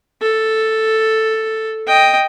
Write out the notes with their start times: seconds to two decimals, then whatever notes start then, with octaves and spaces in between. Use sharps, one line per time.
0.22 A4
1.87 D#5 G5